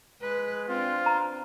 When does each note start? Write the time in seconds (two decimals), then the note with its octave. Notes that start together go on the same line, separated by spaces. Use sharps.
0.22 G#3 B4
0.68 C4 D4 F4
1.06 A#5